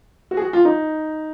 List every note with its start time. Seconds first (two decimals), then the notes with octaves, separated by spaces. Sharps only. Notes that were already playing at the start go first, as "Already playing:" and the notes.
0.31 F#4
0.37 G#4
0.42 F#4
0.53 F4
0.65 D#4